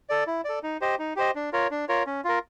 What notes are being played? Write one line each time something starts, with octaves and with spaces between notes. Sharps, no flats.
A4 D5
E4
A4 D5
D#4
G4 C5 D#5
D#4
G4 C5 D#5
D4
F4 A#4 C#5
D4
F4 A#4 C#5
C#4
F4 A#4